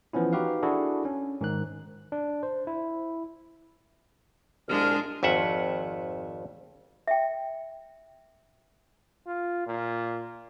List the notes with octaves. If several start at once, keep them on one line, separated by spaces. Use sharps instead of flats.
E3 F3 B3 C#4 E4
D#4 F#4 G4 B4 F5
D4 E4 F#4 G#4 A4
C#4
G#2 D#3 D#4 F#6
D4
C5
E4
C2 A#2 G#3 D4 F6
G#1 F2 E5 F#5
E5 G5
F4
A#2